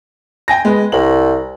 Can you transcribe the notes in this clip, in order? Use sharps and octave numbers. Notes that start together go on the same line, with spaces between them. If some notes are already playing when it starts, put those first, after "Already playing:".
G5 G#5 A#6
G#3 B4
C2 F#7